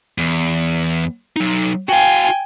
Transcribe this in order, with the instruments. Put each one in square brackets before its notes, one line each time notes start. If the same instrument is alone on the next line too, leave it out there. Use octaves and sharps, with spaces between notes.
[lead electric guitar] E2
F#3 D#4
[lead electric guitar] F#4 F5 [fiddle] G5 G#5